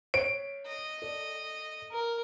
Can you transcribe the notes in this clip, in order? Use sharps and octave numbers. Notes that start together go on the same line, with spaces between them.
C#5 D7
D#5
A4 D5
A#4